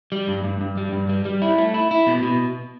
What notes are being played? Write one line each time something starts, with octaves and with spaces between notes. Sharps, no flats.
G3
G2
G2
G2
G3
G2
G3
G3
E4
A3
E4
E4
B2
B2